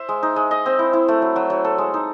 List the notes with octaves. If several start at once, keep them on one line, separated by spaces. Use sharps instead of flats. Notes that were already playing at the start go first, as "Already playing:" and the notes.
Already playing: C5 E5
G#3
D#4
G#3
D#5
C4
E4
E4
A3
F#3
F#3
F#3
A4
G#3
D#4